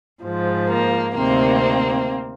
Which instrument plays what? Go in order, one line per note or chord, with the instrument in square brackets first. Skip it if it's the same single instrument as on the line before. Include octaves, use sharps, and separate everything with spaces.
[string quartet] G#2 F3
A#3
D2 C3 D#3 A#3 C4